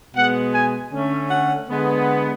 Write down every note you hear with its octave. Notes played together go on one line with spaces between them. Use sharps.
B2 G#3 B3 F#5
G#5
D3 A3 C#4
F#5
D3 G#3 B3